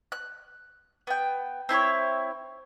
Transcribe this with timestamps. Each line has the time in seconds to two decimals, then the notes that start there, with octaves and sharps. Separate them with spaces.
0.12 F#6
1.07 B3 G5
1.69 C4 E4 A4 C#5